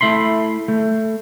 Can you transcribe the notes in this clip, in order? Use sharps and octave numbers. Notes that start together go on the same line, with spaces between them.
A3 E4 B5 C6
A3